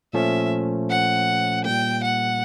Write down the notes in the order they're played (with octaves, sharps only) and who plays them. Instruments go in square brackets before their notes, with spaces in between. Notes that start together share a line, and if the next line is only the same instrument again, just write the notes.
[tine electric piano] A#2 F3 A3 C#4 [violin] E5
[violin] F#5
[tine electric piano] A#2 G3 A#3 [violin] G5
[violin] F#5